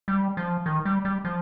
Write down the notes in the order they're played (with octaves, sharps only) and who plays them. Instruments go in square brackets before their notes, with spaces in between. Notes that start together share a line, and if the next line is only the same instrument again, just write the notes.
[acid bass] G3
F3
D#3
G3
G3
F3